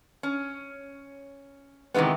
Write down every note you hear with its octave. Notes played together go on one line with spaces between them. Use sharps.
C#4
C3 D#3 E3 G#3 B3